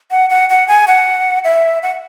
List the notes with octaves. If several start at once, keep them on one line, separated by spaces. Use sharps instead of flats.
F#5
F#5
F#5
G#5
F#5
E5
F#5